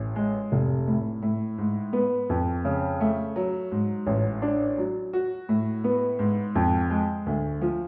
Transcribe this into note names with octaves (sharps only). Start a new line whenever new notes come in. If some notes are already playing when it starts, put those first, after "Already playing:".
Already playing: A1
G#3
F1
A2
A2
G#2
B3
F2
C#3
A3
F#3
G#2
A1
D4
F#3
F#4
A2
B3
G#2
F2
G#3
D2
F3